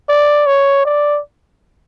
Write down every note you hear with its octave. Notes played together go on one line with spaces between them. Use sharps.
D5
C#5
D5